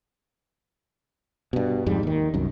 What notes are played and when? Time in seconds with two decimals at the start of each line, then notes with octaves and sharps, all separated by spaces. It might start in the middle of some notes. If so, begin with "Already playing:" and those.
1.53 G2 B2
1.86 F2 G#2 G3
2.03 D#2 D#3
2.34 C2 F#2